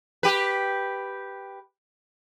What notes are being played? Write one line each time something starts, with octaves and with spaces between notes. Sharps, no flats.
G4 B4